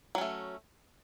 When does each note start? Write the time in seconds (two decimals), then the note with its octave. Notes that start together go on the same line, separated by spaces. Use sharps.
0.15 F#3
0.18 C#4
0.21 A3